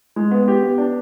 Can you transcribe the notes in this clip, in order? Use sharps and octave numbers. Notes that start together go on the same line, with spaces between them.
G#3
B3
G4
B3
D4